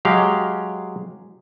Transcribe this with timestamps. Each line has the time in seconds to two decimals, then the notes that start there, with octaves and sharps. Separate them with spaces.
0.05 F#3 G#3 G4 F5